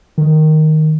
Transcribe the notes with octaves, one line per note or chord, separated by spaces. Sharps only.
D#3